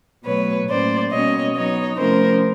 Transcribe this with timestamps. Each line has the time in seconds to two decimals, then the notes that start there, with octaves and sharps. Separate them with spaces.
0.25 B2 F#3 A3 B4 C#5
0.68 A2 F#3 A#3 C#4 C5 D5
1.11 B2 G3 A#3 C#4 C#5 D#5
1.55 F#3 B3 D#4 C#5 D#5
1.98 C3 F3 A3 C#4 E4 A#4 C5